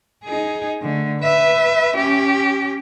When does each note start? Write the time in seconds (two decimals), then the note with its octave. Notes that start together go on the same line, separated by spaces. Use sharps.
0.24 D#4 G#4
0.82 D3 A3
1.20 B4 E5
1.96 C#4 G4